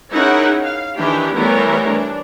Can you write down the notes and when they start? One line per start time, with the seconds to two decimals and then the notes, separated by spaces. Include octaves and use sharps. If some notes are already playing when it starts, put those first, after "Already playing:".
0.14 C#4 D#4 E4 G#4 A#4 F#5
0.64 F5
0.98 D#3 E3 D4 E4 G4
1.35 E3 G3 A3 B3 A#4 C#5
1.89 D4